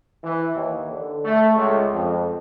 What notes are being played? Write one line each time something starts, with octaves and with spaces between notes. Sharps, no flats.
E3
D#2
D3
A3
C#2
F2